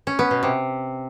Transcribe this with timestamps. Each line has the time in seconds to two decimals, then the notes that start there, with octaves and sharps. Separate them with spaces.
0.07 C#4
0.19 B3
0.31 B2
0.43 C3